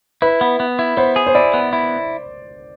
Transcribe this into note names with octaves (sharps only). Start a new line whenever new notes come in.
E4 B4
B3
B3
E4
B3 C5
G#4
C5
E4 D5
B3
E4